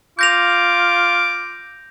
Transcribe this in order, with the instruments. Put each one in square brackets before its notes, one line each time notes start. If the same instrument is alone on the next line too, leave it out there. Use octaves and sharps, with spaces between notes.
[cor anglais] F4 [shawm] D6 [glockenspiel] G6 A#6 F7